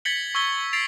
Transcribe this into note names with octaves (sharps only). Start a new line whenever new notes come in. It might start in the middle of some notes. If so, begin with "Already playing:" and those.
G#6 A6 B6 C#7 F#7 G7
C#6 E6 G#6 B6 G7
A6 B6 C7 D7 F7